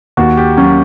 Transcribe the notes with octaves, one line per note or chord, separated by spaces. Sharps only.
D#2 F#4
G4
F#3 C#4